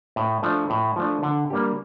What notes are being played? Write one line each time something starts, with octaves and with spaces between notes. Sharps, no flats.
A2
F3 A3 D4
A2
F3 A3 D4
D3
G3 A#3 D4 G4